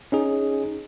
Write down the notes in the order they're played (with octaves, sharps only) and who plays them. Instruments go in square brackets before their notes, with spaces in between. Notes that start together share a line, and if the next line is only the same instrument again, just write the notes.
[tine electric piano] C#4 D#4 G#4